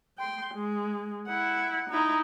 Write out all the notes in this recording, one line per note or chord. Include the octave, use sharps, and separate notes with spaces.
G5 C6
G#3
E4 F#5
D#4 E4